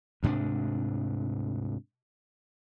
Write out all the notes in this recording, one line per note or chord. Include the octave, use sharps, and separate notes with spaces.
D2 G#2 C3 D4